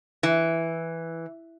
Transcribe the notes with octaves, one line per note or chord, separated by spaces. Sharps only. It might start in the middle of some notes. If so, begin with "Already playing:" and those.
E3